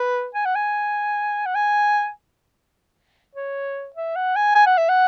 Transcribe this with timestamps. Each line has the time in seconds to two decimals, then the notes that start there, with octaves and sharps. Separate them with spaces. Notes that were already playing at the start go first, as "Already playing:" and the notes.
Already playing: B4
0.35 G#5
0.45 F#5
0.55 G#5
1.46 F#5
1.55 G#5
3.35 C#5
3.96 E5
4.16 F#5
4.36 G#5
4.55 G#5
4.67 F#5
4.78 E5
4.89 F#5